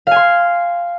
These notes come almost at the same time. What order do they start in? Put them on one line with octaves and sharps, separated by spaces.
F5 G#5 C6